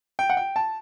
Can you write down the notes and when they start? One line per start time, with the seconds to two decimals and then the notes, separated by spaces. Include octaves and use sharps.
0.19 G5
0.30 F#5
0.37 G5
0.56 A5